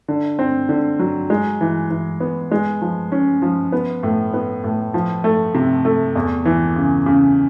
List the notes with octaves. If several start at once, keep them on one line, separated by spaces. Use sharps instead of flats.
D3
C4
D3
F#3
G#3
E3
E3
B3
G#3
F3
C#4
F3
B3
A2
B3
A2
F3
A3
C3
A3
E2
E3
C#3
C#3